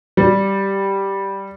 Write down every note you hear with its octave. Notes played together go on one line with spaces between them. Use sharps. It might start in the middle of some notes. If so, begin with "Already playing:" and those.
G3